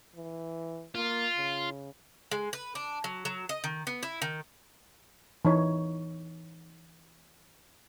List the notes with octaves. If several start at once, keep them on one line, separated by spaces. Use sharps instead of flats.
E3
A#3 F4
C#3
G#3
B4
D4
F#3
F#3
D#5
D#3
B3
E4
D#3
E3 D#4 C#5